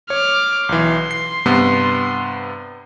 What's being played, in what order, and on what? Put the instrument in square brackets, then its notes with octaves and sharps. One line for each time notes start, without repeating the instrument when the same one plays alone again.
[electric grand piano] C#5 [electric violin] D6 F6
[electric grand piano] B1 E3 [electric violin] C6
[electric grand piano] C7
G2 C3 B3